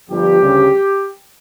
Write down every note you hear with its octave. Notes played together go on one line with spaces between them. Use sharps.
G1 G2 F3 G4
D2 C#3 G3